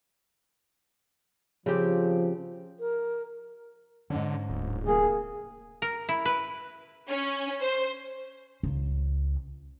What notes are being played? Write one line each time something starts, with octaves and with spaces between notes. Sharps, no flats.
C#3 F3 C4 G4
A#4
G#2 D3 C#4
D1
C3 A#3 G#4
A#4
E4
B4
C#4
C5
C#2